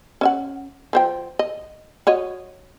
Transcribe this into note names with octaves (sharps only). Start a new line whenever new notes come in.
C#4 E5 F#5
F3 C5 G5
D#5
F#4 C#5 D#5